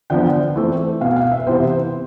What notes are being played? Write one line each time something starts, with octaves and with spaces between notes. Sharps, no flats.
D3 F3 B3 G5
E3 A3 C4
B2 B3 F5
F5
E5
C3 E3 B3 C5